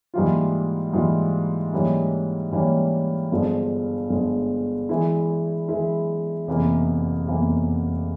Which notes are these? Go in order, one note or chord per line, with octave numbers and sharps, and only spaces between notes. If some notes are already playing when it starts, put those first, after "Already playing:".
G#2 E3 G3 A#3 F4
G#2 E3 G3 A#3 F4
G#2 E3 G3 A#3 C#4
G#2 E3 G3 A#3 C#4
G1 G2 F3 G#3
G1 G2 F3 G#3
E3 G#3 E4
E3 G#3 E4
F1 E2 E3 A#3
F1 E2 E3 A#3